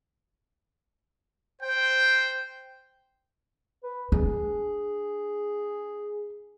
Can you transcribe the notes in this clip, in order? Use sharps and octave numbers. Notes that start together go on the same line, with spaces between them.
C5 G5
B4
D4 G#4